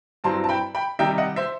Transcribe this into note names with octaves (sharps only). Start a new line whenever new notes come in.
G2 F#3 C4 E4 A5 C6
A5
G5 B5
G5 B5
C3 D#3 G3 D#4 E5 G5
D#5 F#5
C5 E5